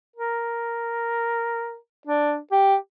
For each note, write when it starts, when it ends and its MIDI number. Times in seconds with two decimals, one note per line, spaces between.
0.16 1.77 70
2.07 2.37 62
2.51 2.75 67